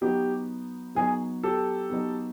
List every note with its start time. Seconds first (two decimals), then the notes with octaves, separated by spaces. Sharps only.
0.01 F#3 B3 D#4 G4
0.95 F#3 B3 D#4 G#4
1.43 G4 A4
1.90 F#3 B3 D#4